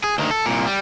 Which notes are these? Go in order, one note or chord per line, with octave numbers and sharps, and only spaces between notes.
G#4
D2 D#3
A4
C2 A#2
G3